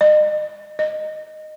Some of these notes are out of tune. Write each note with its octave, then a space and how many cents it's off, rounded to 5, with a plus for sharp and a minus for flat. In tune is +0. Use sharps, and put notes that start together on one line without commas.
D#5 -40
D#5 -15